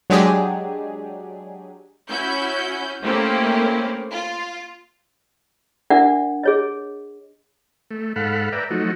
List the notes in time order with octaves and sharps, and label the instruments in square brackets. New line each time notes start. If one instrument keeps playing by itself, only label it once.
[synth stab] F#3 G#3 D4 G4 G#4
[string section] C#4 E4 F#4 G6
A3 A#3 C4 C#4 E4 G4
F4
[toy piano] D4 A#4 D5 E5 F#5
G#4 C#5 D#5
[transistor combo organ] A3
G#2 A4 F5 F#5 B5
B4 D5 E5 G5 A#5
F3 F#3 A3 D#4 F#4